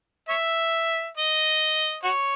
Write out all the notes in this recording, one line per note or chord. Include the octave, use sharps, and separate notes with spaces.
C#5 E5
D#5
F#4 C#5